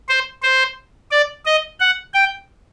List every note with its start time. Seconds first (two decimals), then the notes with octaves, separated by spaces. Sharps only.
0.09 C5
0.43 C5
1.11 D5
1.46 D#5
1.80 F#5
2.14 G5